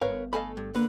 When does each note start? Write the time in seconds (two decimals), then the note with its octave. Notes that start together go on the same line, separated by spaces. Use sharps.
0.01 G1 D3 A#4 B4 C#5 F5
0.33 A3 A4 D#5 F5 G#5 B5
0.57 G2
0.75 D3 A#3 B4